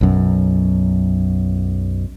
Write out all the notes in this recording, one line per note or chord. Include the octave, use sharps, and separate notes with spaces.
B1 F#2